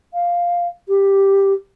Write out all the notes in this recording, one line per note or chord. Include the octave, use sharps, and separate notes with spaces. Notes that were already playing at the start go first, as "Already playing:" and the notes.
F5
G4